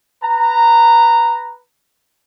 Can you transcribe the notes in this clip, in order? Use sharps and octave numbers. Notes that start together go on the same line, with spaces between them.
B4 A#5